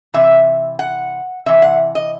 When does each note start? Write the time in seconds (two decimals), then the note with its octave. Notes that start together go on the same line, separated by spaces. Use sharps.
0.14 C3 E3 E5
0.79 F#5
1.46 C3 E3 E5
1.62 F#5
1.95 D#5